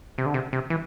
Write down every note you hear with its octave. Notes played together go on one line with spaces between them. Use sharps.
C3
D3
C3
C3
E3